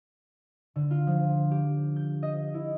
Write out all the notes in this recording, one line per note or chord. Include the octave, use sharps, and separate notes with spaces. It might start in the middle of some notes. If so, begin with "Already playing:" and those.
D3
F4
F3
G4
G6
D#5
E4